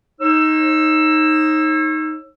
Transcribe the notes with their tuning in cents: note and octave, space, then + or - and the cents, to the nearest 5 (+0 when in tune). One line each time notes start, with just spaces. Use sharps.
D#4 +0 C#5 -40 E6 +10